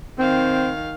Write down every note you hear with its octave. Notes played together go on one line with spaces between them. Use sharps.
D#3 C4 F5